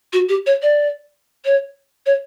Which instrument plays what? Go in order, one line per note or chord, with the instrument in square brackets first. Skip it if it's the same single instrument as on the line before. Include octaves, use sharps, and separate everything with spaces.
[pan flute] F#4
G4
C#5
D5
C#5
C#5